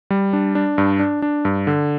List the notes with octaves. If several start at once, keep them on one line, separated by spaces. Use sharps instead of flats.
G3
D4
D4
G2
D4
D4
G2
D3